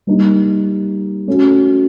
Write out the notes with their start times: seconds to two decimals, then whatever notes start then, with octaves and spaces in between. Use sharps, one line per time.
0.07 G3 A#3 D#4
1.28 A3 C#4 F#4